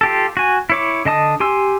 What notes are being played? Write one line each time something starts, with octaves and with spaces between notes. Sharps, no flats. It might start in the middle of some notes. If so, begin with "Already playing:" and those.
F4 G4 A4
F#4 G#5
E4 C#5 D6
D3 D#5 A5 D#6
G4 G#5 C6 E6